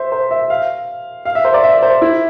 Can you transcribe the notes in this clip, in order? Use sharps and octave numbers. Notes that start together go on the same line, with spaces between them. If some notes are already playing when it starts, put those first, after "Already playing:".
Already playing: C5 E5
C5
E5
F5
F5
E5
C5
D5
E5
C5
E4